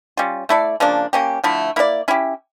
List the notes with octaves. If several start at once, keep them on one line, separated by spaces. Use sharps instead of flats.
G3 C#4 F4
A3 E4 A4 D5
C#3 F3 A#3 D4
A#3 C#4 G4
D3 F3 A3 E4
A#3 E4 A#4 D5
C#4 E4 G4